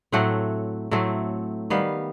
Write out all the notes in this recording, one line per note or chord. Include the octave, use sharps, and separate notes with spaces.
A2 F#3 A3 C4 F#5
A2 F#3 A3 C4
D#3 G3 B3 F5